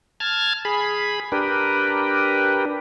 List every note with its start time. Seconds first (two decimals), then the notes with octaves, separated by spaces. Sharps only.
0.20 A5 F6 G#6
0.65 G#4 B5
1.32 D4 G4 A#4 B4